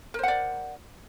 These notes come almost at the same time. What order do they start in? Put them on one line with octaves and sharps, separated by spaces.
A#4 C5 F#5 D5